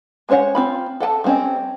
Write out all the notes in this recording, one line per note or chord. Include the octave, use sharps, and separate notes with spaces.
G#3 C#4 C5 C#5 F#5
C4 F4 B5
A4 F#5 G5 A5
F3 G3 C4 C#4 D#5